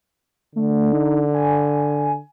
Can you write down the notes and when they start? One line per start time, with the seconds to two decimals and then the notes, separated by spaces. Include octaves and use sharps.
0.56 D3 A3
0.93 D#4
1.34 G#5